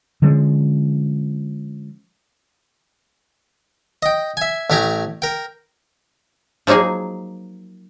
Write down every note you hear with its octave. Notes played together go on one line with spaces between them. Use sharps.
D3 F3 G#3 C#4
D#5 G5
E5 G#5
A1 A3 G4 G#5 A#5
A#4 G5
F3 F#3 A#3 D#4 G#4